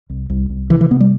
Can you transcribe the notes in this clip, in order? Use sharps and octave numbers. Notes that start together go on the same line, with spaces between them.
C2
C2
C2
C3 E3
E3
C3 B3
G3